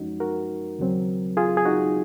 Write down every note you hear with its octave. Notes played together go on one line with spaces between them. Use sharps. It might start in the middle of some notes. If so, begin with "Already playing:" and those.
Already playing: F#2 F3 G#3 C#4 D#4 F#4
F#4 A#4
D#2 C#3 F#3 C4
F4 G#4
G#4
D#4 F#4